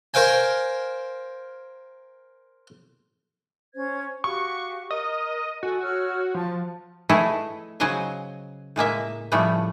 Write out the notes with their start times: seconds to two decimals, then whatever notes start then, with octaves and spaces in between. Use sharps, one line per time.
0.14 A#4 C5 F5 G5 G#5
3.74 C#4 C5 G#6
4.24 F#4 G4 F5 C#6
4.91 A#4 D#5 A#5
5.63 F#4 A4 G#5
5.82 C#5 E6 F6
6.34 F3 A5
7.09 A3 E4 G#4 A4 B4 D#5
7.80 C#3 F#3 C5 D#5 G#5
8.76 A2 G#3 A#3 E5
9.32 A2 C#3 F3 G3 A3 B3